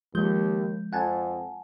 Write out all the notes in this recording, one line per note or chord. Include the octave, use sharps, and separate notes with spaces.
D#2 F3 G#3 G6
F2 F#5 G#5 A5